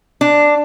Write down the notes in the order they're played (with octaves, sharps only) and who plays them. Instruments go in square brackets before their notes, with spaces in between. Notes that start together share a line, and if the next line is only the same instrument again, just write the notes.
[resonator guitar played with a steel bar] D4